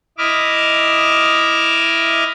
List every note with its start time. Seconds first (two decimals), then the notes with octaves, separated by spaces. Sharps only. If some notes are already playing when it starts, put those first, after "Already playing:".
0.18 E4 D#5 E5 D6 F6